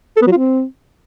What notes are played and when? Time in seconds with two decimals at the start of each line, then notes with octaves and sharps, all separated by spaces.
0.16 A4
0.22 B3
0.27 F#3
0.32 F4
0.37 C4